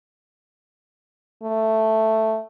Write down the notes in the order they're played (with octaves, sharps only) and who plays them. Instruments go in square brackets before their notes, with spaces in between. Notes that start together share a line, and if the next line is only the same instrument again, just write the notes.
[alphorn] A3